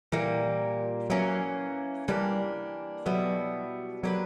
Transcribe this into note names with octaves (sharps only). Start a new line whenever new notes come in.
A#2 E3 G3 A#3
E3 F#3 A#3 C#4
E3 G3 A#3 D4 G4
B2 F#3 G3 B3 E4
F#3 A#3 D4 G4 B4